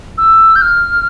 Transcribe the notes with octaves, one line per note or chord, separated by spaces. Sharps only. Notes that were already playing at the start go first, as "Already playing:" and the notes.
E6
G6
F6